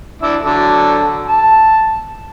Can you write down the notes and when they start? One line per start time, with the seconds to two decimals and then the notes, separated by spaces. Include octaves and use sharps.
0.22 D4 E4 E5
0.42 D3 F#3 A4
1.27 A5